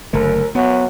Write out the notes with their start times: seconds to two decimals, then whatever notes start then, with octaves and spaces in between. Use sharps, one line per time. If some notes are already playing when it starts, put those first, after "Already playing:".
0.13 F#1 D3 A3 A#4
0.55 F#3 B3